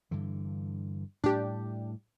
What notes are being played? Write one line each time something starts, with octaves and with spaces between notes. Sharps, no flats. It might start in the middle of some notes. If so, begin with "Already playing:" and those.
G2 D3 E3
A2 G3 D4 G4